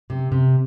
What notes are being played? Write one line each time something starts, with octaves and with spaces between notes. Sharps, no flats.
C3
C3